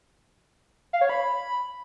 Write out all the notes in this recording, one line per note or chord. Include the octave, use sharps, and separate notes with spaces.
F5
C#5
B5